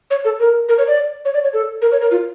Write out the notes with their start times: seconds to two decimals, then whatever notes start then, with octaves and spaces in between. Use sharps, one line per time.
0.11 C#5
0.25 A4
0.40 A#4
0.69 A#4
0.78 C#5
0.88 D5
1.25 C#5
1.34 D5
1.44 C#5
1.54 A4
1.82 A#4
1.92 C#5
2.01 A#4
2.11 F4